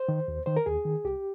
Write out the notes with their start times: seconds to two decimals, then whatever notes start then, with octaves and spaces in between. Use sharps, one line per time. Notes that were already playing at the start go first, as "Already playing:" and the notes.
Already playing: C5
0.09 D#3
0.28 D#2
0.46 D#3 C5
0.57 A#4
0.66 D#2 G#4
0.85 D#3
1.04 C2 G4